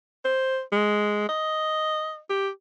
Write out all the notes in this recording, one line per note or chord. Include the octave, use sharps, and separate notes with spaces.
C5
G#3
D#5
G4